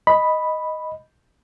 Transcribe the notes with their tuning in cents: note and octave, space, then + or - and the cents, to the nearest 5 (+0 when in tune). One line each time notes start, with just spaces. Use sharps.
D#5 +0 B5 +0